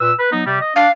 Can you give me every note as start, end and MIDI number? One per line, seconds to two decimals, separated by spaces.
0.01 0.12 46
0.01 0.12 71
0.01 0.12 88
0.20 0.31 71
0.32 0.43 54
0.32 0.43 59
0.32 0.43 63
0.45 0.58 48
0.45 0.58 55
0.61 0.73 75
0.76 0.87 62
0.76 0.91 77